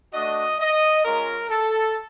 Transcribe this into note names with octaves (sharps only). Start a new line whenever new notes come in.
A3 D4 F#4 D#5
D#5
G#3 C#4 F4 A#4
A4